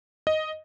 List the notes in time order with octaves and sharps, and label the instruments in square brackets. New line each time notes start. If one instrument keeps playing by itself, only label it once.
[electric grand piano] D#5